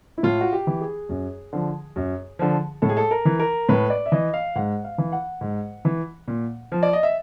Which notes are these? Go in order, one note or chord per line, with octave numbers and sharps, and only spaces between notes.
E4
A2 F4
F#4
G4
E3
G#4
F#2
D3 F3
F#2
D3 F3
A2 A4
G#4
A4
A#4
E3
A#4
A2 B4
D5
E5
E3 D#5
F5
G#2 F#5
F5
E3
F#5
G#2
E3
A#2
F3
D5
D#5
E5